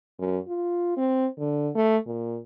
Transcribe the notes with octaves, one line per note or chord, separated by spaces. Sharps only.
F#2
F4
C4
D3
A3
A#2